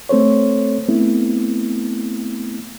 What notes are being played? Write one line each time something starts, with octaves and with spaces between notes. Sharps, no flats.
A3 C4 A4 C5 C#5
A3 B3 C4 E4